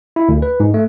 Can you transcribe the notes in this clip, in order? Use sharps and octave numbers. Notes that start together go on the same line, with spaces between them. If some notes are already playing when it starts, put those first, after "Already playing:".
E4
D2
B4
G#2
A3